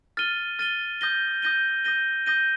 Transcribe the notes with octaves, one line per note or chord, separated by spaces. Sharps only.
F6 A6 D#7 G7
F6 A6 D#7 G7
D#6 G6 A#6 D#7 G7
D#6 G6 A#6 D#7 G7
D#6 G6 A#6 D#7 G7
D#6 G6 A#6 D#7 G7